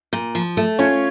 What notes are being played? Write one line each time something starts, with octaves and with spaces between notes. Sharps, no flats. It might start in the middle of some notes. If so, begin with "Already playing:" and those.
A#2
F3
A3
C#4 F4 C#5